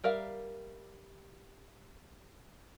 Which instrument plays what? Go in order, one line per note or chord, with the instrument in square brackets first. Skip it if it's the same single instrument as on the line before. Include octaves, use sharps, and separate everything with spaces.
[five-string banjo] G3 A#4 E5 F5